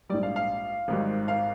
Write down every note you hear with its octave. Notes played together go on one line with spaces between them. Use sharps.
A#1 G#2 G3 D5
F5
F5
G#1 G#2 D#3 G3
F5